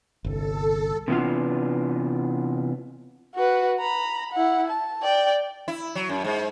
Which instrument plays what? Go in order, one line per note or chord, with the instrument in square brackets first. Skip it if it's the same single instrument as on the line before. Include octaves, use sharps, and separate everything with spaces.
[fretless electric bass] G1 C2 [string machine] A4
[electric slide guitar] C3 E3 B3 D4 F4
[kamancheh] F#4 B4
A#5 B5
E4 F#5
A5
D5 G5
[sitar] E4
F#3
F#2
G#2